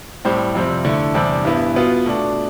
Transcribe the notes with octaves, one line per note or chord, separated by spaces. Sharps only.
A2 G3 C4 G4 C5
F2 C3 G3 C4
D3 A3 E4
E2 C3 G3 D4
G2 E3 B3 E4
B2 B3 F4
B2 A3 D4